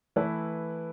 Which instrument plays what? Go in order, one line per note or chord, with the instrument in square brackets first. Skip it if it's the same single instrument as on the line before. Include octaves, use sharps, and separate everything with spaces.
[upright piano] E3 A3 E4 B4